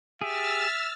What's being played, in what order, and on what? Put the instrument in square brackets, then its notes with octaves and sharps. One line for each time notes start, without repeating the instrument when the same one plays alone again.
[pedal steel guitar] G4 G#4 [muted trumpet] E5 [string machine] E6 F6 A6